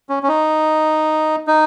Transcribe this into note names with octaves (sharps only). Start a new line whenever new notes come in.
C#4
C#4
D#4
D#4